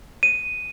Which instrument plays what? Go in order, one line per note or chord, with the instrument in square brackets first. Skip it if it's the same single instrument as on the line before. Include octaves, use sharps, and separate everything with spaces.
[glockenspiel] D#7